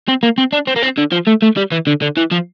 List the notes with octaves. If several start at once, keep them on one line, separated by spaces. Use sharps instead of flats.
C4
A#3
C4
D4
C4
A#3
C4
D3
F3
A3
A3
G3
E3
D3
D3
E3
F3